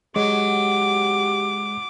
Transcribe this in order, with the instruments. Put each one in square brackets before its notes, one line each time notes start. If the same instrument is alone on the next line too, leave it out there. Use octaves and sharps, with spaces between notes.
[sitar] F#3 [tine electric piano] G#3 [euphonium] G4 [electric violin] D6